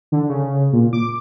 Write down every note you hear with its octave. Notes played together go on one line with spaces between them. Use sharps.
D3
C#3
A#2
D6